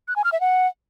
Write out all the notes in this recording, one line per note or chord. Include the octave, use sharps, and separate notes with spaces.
F#6
G#5
F6
E5
F#5